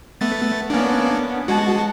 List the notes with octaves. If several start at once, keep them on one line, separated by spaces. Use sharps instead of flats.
A3 B3 A6
A#3 B3 C#4 D4
G#3 F#4 F#5 A5